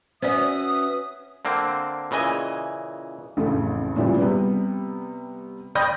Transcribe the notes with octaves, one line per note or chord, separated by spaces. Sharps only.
C#4 F#4 B4 C5 D5 E5 D#6
D3 A#3 C4
A#2 C#3 E3 D#5 G#5
A1 F2 A2 C#3 A4
A#2 C#3 E3 F3 G3
C3 G3 B3
D5 G5 B5 D#6 G6 A#6